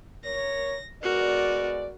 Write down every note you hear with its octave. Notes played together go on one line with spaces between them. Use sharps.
A#4 C#5 A#6
G#3 B3 F#4 A#4 D5